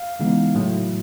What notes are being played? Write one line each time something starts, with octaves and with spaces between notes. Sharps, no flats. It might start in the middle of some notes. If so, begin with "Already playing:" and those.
Already playing: F5
C#3 E3 G#3 B3 D#4
A2 F#3 A3